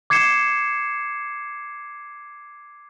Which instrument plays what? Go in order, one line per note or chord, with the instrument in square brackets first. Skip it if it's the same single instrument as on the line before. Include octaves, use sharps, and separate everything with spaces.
[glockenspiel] D6 G#6 C7 C#7 E7